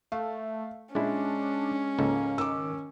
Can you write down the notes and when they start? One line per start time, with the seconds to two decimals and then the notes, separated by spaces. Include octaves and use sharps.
0.12 A3 F5
0.95 A#2 G#3 C#4 D4 E4
1.99 C#2 G#2 A#3 A4
2.38 D#3 D6 E6